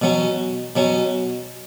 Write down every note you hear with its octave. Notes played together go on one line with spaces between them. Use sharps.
B2 F#3 C#4
B2 F#3 C#4